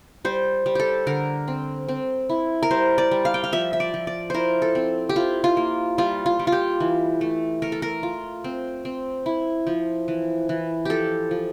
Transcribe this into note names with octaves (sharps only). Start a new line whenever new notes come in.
G3 C5
G3
G4 A4
D3 A#4
C4
C4
E4
A#4
G3 C5
D5
G3
F5
G5
F5
F3 E5
E5
D5
F3
D5
E4 A#4 C5
A4
C4
G4
E4 F4
F4
A#3
G3 F4
F4
G3
F4
G4
E3
A3
A3 A#4
A4
A#4
F4
C4
C4
E4
F3
E3
E3
F3 G4 A4
F3